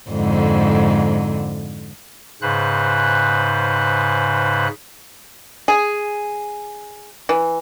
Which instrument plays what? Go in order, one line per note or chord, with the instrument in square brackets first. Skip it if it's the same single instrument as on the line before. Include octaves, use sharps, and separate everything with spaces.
[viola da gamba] F2 G#2 D3
[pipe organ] G#2 C#3 B4 C5 F#6
[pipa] G#4
E3